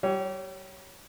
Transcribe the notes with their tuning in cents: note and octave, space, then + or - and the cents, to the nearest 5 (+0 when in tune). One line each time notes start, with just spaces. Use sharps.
G3 -30 C#5 +0